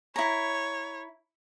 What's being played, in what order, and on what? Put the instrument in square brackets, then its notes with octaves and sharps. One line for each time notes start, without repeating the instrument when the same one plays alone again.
[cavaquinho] E4 A#5 [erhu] C#5